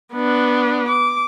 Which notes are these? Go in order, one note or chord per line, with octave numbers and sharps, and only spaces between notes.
B3 D4
D6